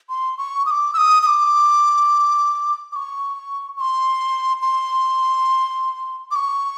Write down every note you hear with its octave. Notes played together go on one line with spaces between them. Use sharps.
C6
C#6
D#6
D6
E6
D#6
D#6
D6
D6
C#6
C#6
C6
C6
D6
C#6